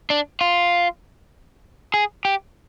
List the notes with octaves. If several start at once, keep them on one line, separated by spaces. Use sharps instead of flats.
D4
F4
G#4
G4